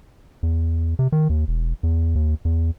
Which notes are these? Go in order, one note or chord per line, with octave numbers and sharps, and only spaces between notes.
E2
C3
D#3
D#2
E1
E2
D#2
E2